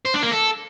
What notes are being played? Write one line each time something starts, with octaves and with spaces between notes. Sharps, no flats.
C5
D4
A#3
A4